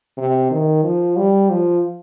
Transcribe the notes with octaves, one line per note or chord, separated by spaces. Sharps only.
C3
D#3
F3
G3
F3